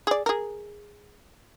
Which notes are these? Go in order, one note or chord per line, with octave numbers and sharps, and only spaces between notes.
G#4 D5
G#4 A#4